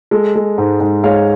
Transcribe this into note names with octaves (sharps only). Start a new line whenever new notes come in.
G#3 A4
G#3
G#2
G#2
G#3 C#5 F5